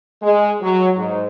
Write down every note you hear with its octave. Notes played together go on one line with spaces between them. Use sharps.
G#3
F#3
G#2